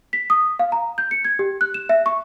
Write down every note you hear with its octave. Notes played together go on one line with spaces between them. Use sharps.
B6
D#6
F5
A#5
G6
C#7
G#6
G4
F#6
E7
E5
C#6